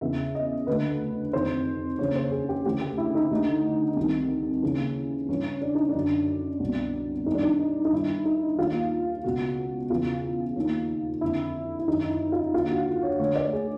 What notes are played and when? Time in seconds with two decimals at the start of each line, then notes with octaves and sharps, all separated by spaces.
0.01 E2 C#3 E3 E5
0.35 D#5
0.67 D2 D3 B4
1.33 F2 C3 D#3 C5
1.99 D#2 C#3 E3 C#5
2.16 C5
2.31 G#4
2.49 G4
2.65 D2 C#3 E3 G4
2.81 G4
2.98 E4
3.15 D#4
3.31 D2 D3
3.96 C2 C3 D#3
4.62 D#2 C#3 E3
5.29 G2 E3 C#4
5.61 D4
5.75 D#4
5.89 D4
5.94 F#2 D3
6.60 C2 B2
7.26 G2 D#3 D#4
7.35 D4
7.43 D#4
7.85 D#4
7.92 G2 D#3 E4
8.25 D#4
8.58 D#2 D#3 F4
9.24 C#2 B2 F#4
9.90 E2 C#3 E3 F4
10.56 D#2 D#3
11.21 F2 D3 E4
11.79 E4
11.88 F#2 D#3 D#4
12.09 E4
12.32 F4
12.54 D#2 D3 F4
12.71 F#4
13.03 C#5
13.19 D2 D3 C#5
13.36 D5
13.53 G#4